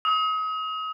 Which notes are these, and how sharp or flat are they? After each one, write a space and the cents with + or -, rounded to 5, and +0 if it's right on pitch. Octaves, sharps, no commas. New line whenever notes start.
D#6 +35